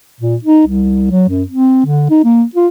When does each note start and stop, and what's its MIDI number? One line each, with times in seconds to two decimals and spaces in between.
0.20 0.36 46
0.44 0.62 63
0.67 1.07 36
1.11 1.24 54
1.28 1.43 42
1.48 1.82 60
1.86 2.09 50
2.10 2.22 63
2.24 2.43 58
2.55 2.68 65